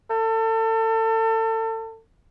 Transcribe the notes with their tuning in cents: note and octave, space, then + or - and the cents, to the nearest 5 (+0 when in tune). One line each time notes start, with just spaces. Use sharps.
A4 +30